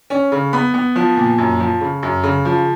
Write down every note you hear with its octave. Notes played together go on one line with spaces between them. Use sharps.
C#4
C#3
B3 B5
B3
F3
A#2
F#2
F3
C#3
F#2
C#3
F3